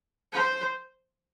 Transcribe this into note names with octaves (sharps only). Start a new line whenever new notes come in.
C5